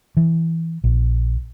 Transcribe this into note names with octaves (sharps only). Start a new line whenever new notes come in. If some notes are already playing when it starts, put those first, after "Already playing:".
E3
A#1